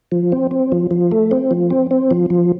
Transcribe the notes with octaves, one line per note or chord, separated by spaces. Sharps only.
F3
C4
C4
F3
F3
A3
C4
F3
C4
C4
F3
F3